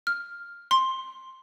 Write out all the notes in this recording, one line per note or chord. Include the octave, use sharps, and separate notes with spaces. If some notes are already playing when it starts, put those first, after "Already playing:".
F6
C6